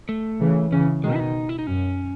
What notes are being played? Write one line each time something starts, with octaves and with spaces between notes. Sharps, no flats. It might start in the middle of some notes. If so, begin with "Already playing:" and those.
A3
C#3 E3
C#3 E3 C#4
B2 D#3 G#3
E4
D#4
E4
D#4
F#2 C#4